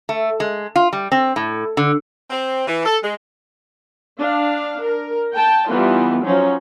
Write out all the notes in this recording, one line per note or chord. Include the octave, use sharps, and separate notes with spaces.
A3
G#3
F4
G3
C4
A2
D3
C4
E3
A4
G#3
D4 F5
A#4
G5 A5
E3 G3 B3 D#4 F4
F3 F#3 C#4 D#4